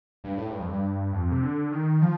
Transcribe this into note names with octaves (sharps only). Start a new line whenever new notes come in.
G2
A2
G2
F2
G2
F2
C3
D3
D#3
F3